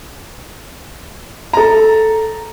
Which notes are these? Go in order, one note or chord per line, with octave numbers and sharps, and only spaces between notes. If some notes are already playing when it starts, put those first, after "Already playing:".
A4 A#5